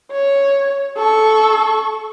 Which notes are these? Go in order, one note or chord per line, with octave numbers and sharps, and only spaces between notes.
C#5
A4 C#6